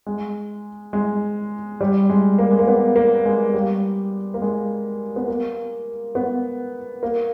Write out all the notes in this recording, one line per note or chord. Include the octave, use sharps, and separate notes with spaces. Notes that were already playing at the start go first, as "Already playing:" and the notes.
G#3
G#3
G3
G#3
A#3
G#3
A#3
B3
A#3
G#3
G3
A#3
G#3
B3
A#3
B3
A#3